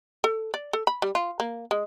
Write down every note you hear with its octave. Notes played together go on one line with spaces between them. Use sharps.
A4
D5
A4
B5
G3
F4
A#3
G#3